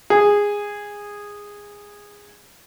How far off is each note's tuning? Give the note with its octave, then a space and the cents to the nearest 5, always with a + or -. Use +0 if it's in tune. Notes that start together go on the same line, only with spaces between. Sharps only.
G#4 -15